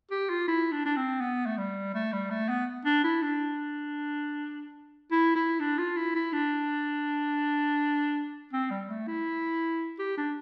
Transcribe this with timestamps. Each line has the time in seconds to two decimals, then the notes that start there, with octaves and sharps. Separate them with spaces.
0.11 G4
0.30 F4
0.48 E4
0.72 D4
0.86 D4
0.96 C4
1.21 B3
1.46 A3
1.57 G3
1.94 A3
2.12 G3
2.30 A3
2.48 B3
2.85 D4
3.04 E4
3.22 D4
5.11 E4
5.35 E4
5.60 D4
5.78 F4
5.96 E4
6.15 E4
6.33 D4
8.53 C4
8.70 G3
8.89 A3
9.07 E4
9.99 G4
10.17 D4